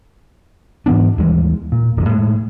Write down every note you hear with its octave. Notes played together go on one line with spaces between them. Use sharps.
G#2 E3 B3 D4
D#2 E3 G3 G#3
A#2
D1 F2
A2 G#3